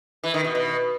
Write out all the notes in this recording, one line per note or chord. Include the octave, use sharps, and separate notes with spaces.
E3
D#3
B2
B2